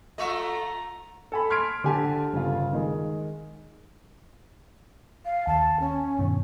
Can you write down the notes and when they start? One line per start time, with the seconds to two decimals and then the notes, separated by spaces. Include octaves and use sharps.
0.18 A3 F4 D#5 E5 A#5 C#6
1.32 A4 G#5 B5
1.50 C6 F6 G#6 B6 D7
1.84 D3 G4 G#5 A5
2.33 G1 C#3 F4
2.73 D#3 G#3
5.25 F5
5.47 D#2 A5
5.80 C#4
6.19 G2 B2 D#3